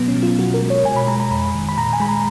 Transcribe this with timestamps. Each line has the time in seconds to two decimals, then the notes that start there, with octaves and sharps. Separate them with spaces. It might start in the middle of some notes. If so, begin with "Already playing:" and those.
Already playing: B2 F#3 B3
0.08 C#4
0.16 F#3
0.23 F4
0.39 B2 F#4
0.54 A#4
0.62 G#3
0.70 C#5
0.85 B2 G#5
0.96 B5
1.08 G#3 A#5
1.20 A#5
1.31 F2 B5
1.54 D#3
1.69 B5
1.77 A#2 A#5
1.93 G#5
2.00 G#3 B5
2.08 A#5